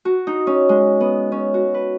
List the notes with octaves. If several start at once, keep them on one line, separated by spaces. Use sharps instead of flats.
F#4
D#4
C#4
G#3
B3
C#4
F#4
B4